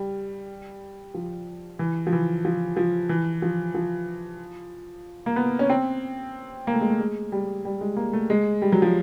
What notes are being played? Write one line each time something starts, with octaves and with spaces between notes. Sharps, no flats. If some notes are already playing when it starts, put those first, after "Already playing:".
Already playing: G3
F3
E3
F3
E3
F3
F3
E3
F3
F3
A#3
B3
C#4
C4
A#3
A3
G#3
A3
G#3
G3
G3
G#3
A#3
A3
G#3
G3
F#3
F3